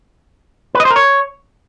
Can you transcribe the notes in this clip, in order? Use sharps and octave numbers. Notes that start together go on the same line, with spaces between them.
B4
D#5
C5
A#4
C#5